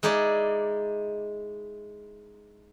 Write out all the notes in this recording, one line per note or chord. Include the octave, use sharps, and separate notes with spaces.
G#3 D#4 E4 G#4 D5